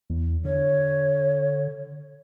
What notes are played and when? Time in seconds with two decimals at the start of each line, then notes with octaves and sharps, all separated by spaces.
0.10 E2
0.45 D3 C#5